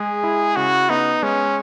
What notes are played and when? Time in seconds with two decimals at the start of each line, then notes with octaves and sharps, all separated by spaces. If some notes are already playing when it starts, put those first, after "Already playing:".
Already playing: G#3 G#4
0.24 E4
0.56 C#3 F#4
0.90 B3 D#4
1.23 G#3 C#4